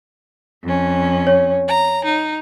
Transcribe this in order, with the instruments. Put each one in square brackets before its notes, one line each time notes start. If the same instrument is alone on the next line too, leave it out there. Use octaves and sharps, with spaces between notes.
[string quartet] F2 C#4
[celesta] C#5
[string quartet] A#5
D#4